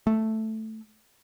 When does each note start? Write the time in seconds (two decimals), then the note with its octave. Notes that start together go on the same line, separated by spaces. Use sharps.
0.07 A3